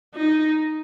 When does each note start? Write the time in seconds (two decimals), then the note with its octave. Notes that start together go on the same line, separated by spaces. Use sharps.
0.14 D#4